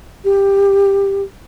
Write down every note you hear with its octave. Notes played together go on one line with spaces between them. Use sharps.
G4